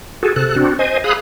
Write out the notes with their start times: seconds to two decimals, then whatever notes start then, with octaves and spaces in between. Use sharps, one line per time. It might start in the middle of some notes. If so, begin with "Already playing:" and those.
0.23 F#4 G#4 A4
0.36 C3 A4 F#6
0.56 C4 D4 F#4
0.79 C5 D#5 G#5
1.04 G#4 F5 B5 D#6 F#6